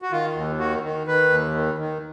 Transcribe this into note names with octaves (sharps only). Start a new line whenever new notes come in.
F#4
D#3 F4
D#2
D#3 F#4
D#3
D#3 B4
D#2
D#3
D#3